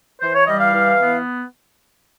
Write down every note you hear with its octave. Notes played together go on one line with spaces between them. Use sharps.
E3 C5
C#5
G3 D#5
F5
E3
B3